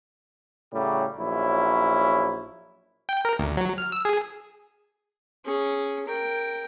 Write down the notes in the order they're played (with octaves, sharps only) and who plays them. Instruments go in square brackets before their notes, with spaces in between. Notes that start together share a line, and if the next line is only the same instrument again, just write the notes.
[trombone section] A2 C#3 F#3 G3
A#1 F#3 C#4 E4
[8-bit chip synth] G5
A#4
D2
F#3
F6
E6
G#4
[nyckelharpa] C#4 G#4
A#4 G5